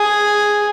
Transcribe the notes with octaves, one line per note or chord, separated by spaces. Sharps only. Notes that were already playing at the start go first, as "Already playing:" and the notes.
Already playing: G#4